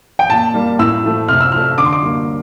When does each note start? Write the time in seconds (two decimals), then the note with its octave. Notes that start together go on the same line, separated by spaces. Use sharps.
0.19 G5
0.30 A#2 A5
0.54 G3 A#3
0.79 A2 E6
1.04 F3 A3
1.28 C3 F6
1.41 E6
1.52 F3 A3 F6
1.78 D3 D6
1.85 C6
1.93 D6
2.02 G3 A#3